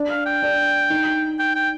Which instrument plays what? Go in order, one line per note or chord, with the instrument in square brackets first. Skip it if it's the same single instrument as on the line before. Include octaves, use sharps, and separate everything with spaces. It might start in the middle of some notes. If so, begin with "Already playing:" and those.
Already playing: [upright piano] D4
[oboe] F5
G5
[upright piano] D4
D#4
[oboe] G5
G5